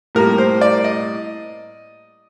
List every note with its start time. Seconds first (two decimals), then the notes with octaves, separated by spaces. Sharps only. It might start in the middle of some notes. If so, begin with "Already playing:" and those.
0.15 A2 G3 A#3 A#4
0.38 C5
0.61 D5
0.84 D#5